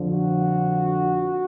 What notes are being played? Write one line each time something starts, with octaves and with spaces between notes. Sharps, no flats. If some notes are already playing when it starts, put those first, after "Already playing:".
Already playing: F2 D3 F3
F#4